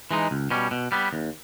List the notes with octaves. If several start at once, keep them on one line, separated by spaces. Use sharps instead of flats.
E3 G#3 D#4
C#2
B2 G3 C#4
B2
G3 B3
D#2